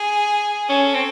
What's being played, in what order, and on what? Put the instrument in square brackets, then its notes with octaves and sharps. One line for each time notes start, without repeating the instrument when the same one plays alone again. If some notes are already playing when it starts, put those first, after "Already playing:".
Already playing: [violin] G#4
[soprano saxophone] C#4 [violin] A4
[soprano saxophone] C4